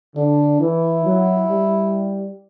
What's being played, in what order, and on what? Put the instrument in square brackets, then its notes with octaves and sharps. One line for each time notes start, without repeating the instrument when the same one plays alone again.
[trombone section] D3 [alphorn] D4
[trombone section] E3 [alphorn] E4
[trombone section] F#3
G3